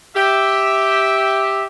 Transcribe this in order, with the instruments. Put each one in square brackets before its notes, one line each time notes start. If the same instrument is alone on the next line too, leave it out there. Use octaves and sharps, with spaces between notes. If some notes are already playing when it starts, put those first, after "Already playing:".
[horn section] G4 E5